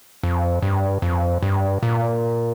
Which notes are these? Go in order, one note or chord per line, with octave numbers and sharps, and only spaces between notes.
F2
G2
F2
G2
A#2